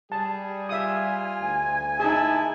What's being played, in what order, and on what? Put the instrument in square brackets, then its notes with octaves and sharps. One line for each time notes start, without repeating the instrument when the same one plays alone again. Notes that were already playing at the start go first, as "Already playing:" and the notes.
[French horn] G3 [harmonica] G#4 [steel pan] A5
[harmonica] F4 [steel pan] E5 D#6 [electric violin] G#5
[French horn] D2 [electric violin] G#5
[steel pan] D#4 G#4 [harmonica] E4 E5 A5